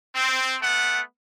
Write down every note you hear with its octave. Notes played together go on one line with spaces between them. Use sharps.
C4
A3 B3 F#5